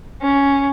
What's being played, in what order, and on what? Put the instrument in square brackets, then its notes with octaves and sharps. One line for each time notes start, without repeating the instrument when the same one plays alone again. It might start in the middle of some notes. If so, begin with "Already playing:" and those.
[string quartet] C#4